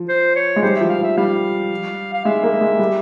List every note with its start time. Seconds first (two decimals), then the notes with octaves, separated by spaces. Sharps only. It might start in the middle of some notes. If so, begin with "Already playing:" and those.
Already playing: F3
0.09 C5
0.36 C#5
0.56 G#3
0.62 G3 C5
0.76 F3 E5
0.89 F5
0.98 F3
1.04 E5
1.17 G3 F5
2.14 F5
2.25 G#3 E5
2.43 A#3
2.61 G#3
2.79 G3